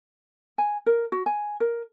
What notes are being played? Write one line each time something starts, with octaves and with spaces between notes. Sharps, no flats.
G#5
A#4
F#4
G#5
A#4